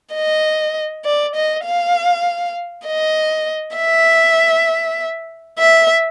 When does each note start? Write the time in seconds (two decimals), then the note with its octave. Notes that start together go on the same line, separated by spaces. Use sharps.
0.14 D#5
1.05 D5
1.36 D#5
1.65 F5
2.87 D#5
3.77 E5
5.59 E5